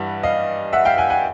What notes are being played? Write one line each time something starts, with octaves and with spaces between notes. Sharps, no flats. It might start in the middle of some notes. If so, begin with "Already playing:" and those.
Already playing: G2 E3 G3 F#5
D#5 F5
E5 F#5
F5 G5
F#5 G#5
F#5 G#5